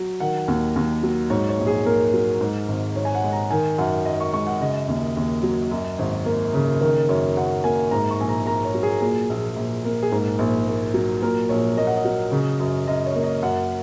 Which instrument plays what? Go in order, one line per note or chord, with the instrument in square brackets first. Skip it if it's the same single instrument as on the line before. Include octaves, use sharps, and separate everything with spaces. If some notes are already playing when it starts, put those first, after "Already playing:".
Already playing: [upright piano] F#3
D#3 F#5
D#2
D#2
F#3
G#2 C#5
C#5
A#1
G#4
A#3 A#4
F#3
G#2
G#1
G#1 C#5
G#5
F#5
G#3
A#5
D#3 G#5
F#2 F#5
F#2 D#5
C#6
G#3 C#6
F#5
C#3 D#5
D#2
D#2
F#3
F#2
G#1
A#3
C#3
D#3 A#4
F#2 C#5
F#2 F#5
A#3 G#5
G#2 A#5
C#6
A#1 G#5
A#5
A#3 A#5
C#5
F#3
G#4
A#2 G#4
A#1
A#1
A#3
G#4
G#2 A#4
A#1
A#3
F#3
A#2 A#4
A#1 C#5
A#3 D#5
F#5
D#5
F#3
C#3
F#2
F#2 D#5
C#5
A#3
D#5
F#2 F#5